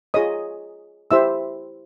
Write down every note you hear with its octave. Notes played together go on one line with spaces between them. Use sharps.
F4 G#4 C#5 D#5 D#6
E4 G4 C5 E5 E6